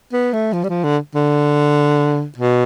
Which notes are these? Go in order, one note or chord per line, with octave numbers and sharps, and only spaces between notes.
B3
A3
F3
G3
F3
D3
D3
B2